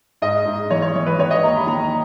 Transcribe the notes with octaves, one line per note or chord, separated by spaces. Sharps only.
G#2 D#5
G#2
E3 C#5
C#5
E3
B4
D#3 C#5
D#5
D#2 A#5
B5
D#3 A#5